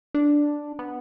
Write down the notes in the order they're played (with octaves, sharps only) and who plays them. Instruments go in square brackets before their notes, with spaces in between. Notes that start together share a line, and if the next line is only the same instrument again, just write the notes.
[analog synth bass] D4
B3